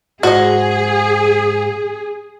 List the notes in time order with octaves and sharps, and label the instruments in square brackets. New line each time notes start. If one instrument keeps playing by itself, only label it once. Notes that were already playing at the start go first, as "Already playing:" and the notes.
[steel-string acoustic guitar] G#2 [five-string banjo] F#4 D#5 [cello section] G#4